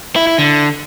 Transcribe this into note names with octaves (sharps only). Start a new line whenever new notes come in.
E4
E4
D3